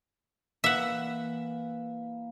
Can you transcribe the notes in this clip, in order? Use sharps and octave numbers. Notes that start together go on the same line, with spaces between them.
E3 A#3 E5 F#5